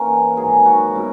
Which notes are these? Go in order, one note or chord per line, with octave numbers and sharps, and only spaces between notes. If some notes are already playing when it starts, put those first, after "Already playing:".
Already playing: E3 A#3 C#4 A#4
G#2 D#3 F#3 G#4
F#4
B2 G#3 C#4 E4